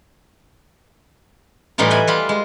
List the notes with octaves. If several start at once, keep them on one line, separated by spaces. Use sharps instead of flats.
A2 E3 G3 D#4 F4
B4 E5 G#5 B5
G3 F4 B5
G#3